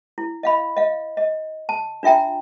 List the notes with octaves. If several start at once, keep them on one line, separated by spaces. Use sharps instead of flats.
E4
D#5 F5 B5
D#5 F5
D#5
A5
D4 F4 E5 G5 A#5